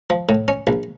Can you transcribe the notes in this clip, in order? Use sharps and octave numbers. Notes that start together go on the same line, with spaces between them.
F3
A2
C#4
A#1